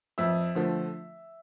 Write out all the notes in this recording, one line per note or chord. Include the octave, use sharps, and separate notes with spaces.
F2 E5 E6
D3 F3 A3